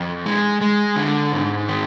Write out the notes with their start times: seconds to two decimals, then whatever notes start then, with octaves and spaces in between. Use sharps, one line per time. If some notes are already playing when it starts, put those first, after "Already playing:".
Already playing: F2
0.26 G#3
0.61 G#3
0.96 D3
1.32 G#2
1.68 D#3